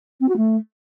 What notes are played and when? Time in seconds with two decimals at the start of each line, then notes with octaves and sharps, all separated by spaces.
0.20 C4
0.28 F#4
0.37 A3